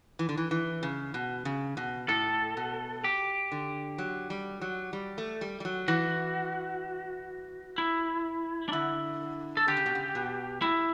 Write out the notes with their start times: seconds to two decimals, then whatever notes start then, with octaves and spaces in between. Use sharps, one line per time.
0.19 E3
0.29 D3
0.37 E3
0.51 E3
0.83 C#3
1.14 B2
1.45 C#3
1.77 B2
2.09 A2 A4
2.57 B2
3.04 G4
3.52 D3
3.98 F#3
4.30 G3
4.61 F#3
4.93 G3
5.18 A3
5.41 G3
5.60 G3
5.65 F#3
5.88 E3 F#4
7.78 E4
8.69 D4
8.72 D3 E4
9.57 A4
9.68 D3 G4
9.77 C#3
9.86 B2
9.95 C#3
10.15 B2
10.62 A2 E4